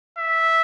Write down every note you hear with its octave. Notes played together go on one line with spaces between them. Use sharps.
E5